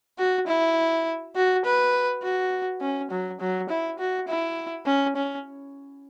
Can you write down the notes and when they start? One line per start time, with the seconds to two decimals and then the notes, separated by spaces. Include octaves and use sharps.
0.18 F#4
0.47 E4
1.36 F#4
1.65 B4
2.23 F#4
2.81 C#4
3.11 F#3
3.40 F#3
3.69 E4
3.99 F#4
4.28 E4
4.86 C#4
5.16 C#4